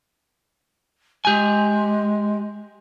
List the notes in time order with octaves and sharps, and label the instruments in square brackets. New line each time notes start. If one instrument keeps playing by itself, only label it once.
[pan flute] G#3 [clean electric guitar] G4 G#5